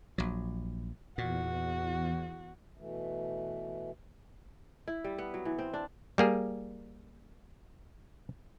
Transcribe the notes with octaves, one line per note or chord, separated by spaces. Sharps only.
A#1 F#3
E2 A#2 F#4
B2 E3 A3
E4
G3
B3
F#3
E3
C4
D4
G3 A#3 G#4